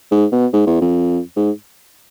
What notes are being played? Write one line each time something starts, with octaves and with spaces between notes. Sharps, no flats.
G#2
B2
G#2
E2
F2
G#2